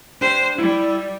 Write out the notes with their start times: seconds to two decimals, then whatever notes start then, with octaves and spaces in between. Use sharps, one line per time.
0.21 D4 G4 C5
0.58 G3 E4